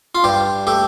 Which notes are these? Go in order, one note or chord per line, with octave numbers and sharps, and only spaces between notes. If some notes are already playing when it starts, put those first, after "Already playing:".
F4
G2 G4
A3 G4